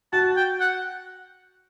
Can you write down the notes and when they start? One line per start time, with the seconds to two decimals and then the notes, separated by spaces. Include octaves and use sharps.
0.13 F#4 A5
0.36 G5
0.60 F#5